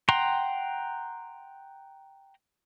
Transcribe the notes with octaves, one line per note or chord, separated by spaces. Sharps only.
F#5 G5 A#5 C6